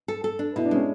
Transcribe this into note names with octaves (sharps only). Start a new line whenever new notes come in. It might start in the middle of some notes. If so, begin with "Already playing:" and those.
A4
A4
D4
B2 E4
D4
G#3 C#4